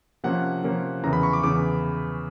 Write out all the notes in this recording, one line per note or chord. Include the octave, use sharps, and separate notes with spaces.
C3 F3 A#3 C#4 F#5
C3 F3 A#3 C#4
E2 C#3 E3 A#5
B5
C#6
D6
E2 C#3 E3 D6